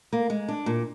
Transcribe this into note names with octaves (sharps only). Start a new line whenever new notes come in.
A#3
G#3
D4
A#2